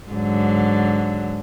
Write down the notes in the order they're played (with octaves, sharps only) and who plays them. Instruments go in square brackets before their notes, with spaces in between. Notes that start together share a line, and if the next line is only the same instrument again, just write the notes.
[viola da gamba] G#2 D3 F#3